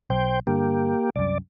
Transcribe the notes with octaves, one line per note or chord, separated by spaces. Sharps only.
B1 C5 G5
G2 D3 A#3 G4
C2 F#2 D5